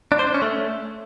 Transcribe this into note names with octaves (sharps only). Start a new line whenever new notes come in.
D4
C5
D4
C#4
A3